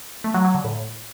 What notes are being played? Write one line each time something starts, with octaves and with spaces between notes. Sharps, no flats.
A3
F#3
F#3
D3
A2